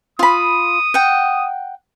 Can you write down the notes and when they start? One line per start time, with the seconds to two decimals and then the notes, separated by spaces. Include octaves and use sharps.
0.19 F4 B5 D#6
0.94 F#5 G5